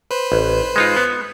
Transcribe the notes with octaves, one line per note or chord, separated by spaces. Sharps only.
B4 C5
A1
G#3 D#4 F4
B3